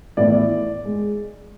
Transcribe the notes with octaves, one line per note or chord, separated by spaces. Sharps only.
A2 E3 B3 D5
G#3